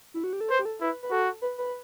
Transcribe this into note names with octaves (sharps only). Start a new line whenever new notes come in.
E4
F#4
G4
A4
B4 C5
G4
A4
E4 B4
B4
F#4 A4
B4
B4